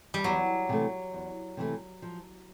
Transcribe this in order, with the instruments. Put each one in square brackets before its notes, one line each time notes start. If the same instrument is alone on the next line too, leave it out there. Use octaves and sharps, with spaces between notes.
[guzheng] G3
[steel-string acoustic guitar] E2 [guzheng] F#3
[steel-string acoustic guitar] C3 E3 A3
E2
C3 E3 A3
F3